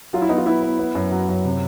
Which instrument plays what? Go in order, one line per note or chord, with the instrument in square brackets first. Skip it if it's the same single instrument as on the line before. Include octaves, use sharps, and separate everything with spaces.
[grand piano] F#3 [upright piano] F4
[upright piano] E4
[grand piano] B3 [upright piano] D#4
[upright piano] F4
[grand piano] B3 [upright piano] E4
[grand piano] B3
B3
F#2
F#3
F#2
C3